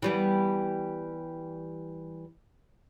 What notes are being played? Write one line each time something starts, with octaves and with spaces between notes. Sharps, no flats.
E3 G3 B3